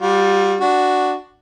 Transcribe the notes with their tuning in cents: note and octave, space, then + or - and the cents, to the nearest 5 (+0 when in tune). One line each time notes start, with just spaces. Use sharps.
G3 +0 F4 +45
D4 +0 F#4 +0